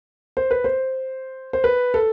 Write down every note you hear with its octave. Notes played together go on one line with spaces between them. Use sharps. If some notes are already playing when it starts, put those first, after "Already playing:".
C5
B4
C5
C5
B4
A4